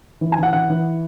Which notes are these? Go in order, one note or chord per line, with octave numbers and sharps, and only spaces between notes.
E3
G#5
E3 F#5
E3 F#5
E3